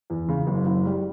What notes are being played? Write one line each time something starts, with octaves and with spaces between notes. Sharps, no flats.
E2
C#3
F#1
F#1
G3